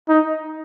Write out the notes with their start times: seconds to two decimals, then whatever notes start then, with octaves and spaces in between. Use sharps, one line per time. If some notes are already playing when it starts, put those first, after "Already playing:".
0.09 D#4